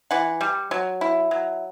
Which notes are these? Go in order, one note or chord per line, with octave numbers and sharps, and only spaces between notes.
E3 F#5
G3
F#3
E4
F#3